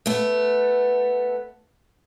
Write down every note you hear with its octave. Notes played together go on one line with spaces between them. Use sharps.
A3 B3